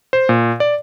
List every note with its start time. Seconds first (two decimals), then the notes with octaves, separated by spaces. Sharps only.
0.13 C5
0.29 A#2
0.60 D5